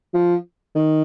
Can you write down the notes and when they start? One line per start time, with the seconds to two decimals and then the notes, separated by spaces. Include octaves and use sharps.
0.14 F3
0.76 D#3